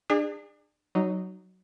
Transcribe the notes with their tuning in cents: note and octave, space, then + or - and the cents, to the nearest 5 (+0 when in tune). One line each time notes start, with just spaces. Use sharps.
D4 +30 G#4 -30
F#3 +15 D#4 -10